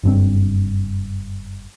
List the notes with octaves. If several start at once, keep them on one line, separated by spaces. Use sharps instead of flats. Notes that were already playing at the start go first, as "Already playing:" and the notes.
F#1 G2 C4